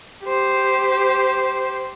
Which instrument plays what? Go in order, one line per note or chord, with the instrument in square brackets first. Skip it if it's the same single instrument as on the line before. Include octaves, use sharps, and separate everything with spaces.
[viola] G4 C5